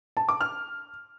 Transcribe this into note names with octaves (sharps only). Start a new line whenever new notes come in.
A5
D6
F6